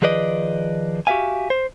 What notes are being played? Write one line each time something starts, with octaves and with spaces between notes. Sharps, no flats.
D#3 F3 G#4 B4 D5 D#5
F#4 G4 A4 E5 F5 G#5
C5